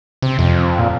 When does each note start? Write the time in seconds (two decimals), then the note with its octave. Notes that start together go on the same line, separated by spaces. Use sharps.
0.22 C3
0.39 F2
0.79 A#2